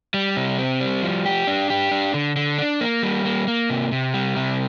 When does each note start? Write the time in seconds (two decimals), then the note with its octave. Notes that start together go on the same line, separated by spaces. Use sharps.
0.14 G3
0.36 C3
0.58 C4
0.80 G3
1.02 F3
1.25 G4
1.47 D4
1.70 G4
1.91 D4
2.14 D3
2.36 D3
2.58 D4
2.81 A#3
3.03 G3
3.25 A#3
3.47 A#3
3.70 C3
3.92 C3
4.14 G3
4.36 C3